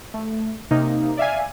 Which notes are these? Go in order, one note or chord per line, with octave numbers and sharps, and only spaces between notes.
A3
C3 A#3 D#4
D5 E5 F5 G#5